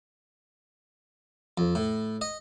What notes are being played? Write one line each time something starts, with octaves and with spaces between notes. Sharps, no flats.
F2
A2
D#5